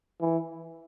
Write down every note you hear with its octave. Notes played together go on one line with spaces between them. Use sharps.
E3